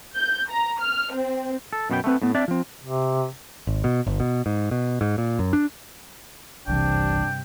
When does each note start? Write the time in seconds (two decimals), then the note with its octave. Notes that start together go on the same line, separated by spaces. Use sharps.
0.14 G6
0.50 A#5
0.81 F6
1.14 C4
1.73 A4
1.90 F#2 B2 B3 F4 G5
2.04 A3 B3 C4 B4
2.22 A2 B3
2.35 C4 D4 D5 E5
2.48 F3 C4
2.83 C3
3.67 G#1
3.84 B2
4.07 G1
4.20 B2
4.46 G#2
4.71 B2
5.01 G#2
5.18 A#2
5.39 F#2
5.53 D4
6.67 F#1 C2 G2 C3 E3 D4 G5